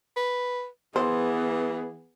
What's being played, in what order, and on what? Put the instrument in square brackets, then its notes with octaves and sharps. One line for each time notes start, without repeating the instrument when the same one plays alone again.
[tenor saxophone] B4
[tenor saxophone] E3 [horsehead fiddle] B3 G#4 [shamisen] C5